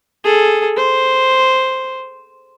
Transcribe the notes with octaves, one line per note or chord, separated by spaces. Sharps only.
G#4 A4
C5